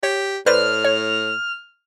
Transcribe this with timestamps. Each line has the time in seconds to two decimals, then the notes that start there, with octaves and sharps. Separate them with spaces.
0.03 G4 C#5
0.46 A2 B4 C5 D5 F6
0.85 C#5